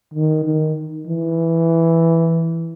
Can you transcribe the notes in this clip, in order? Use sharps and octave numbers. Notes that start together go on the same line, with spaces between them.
D#3
D#3
E3